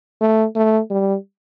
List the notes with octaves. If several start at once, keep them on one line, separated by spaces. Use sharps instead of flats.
A3
A3
G3